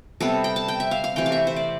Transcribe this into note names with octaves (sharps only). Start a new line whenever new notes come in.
C3 G3 B3 A4
G5
A5
G5
E5
F5
F5
C3 E3 A3 G5
F5
E5
C5
D5